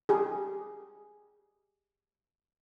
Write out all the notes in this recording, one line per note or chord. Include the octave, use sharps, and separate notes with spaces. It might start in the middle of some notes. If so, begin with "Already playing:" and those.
G4 G#4